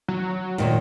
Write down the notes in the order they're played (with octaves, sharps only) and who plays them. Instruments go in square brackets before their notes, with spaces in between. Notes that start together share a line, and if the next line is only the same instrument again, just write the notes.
[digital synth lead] F#3
[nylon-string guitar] D#2 A#2 D#3